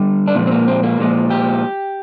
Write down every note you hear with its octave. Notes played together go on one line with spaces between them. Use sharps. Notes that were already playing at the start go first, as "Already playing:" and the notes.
Already playing: D3 G3
D4
A#2 F3 G#3 C4
C4
A#3
C4
A#3
A#2 F3 G#3
G4